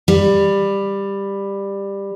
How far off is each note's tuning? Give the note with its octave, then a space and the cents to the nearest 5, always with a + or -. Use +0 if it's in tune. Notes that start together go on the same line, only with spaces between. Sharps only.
G3 +15